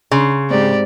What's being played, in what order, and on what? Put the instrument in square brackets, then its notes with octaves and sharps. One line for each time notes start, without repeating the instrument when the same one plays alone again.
[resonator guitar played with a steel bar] C#3 [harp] C6
[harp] G#2 C4 [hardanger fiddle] G4 D5